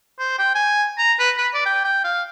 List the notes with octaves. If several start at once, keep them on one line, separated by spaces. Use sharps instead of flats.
C5
G5
G#5
A#5
B4
B4
D5
G5
G5
F5